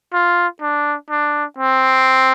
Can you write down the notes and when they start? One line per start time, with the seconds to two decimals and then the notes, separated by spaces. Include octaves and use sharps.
0.13 F4
0.61 D4
1.10 D4
1.58 C4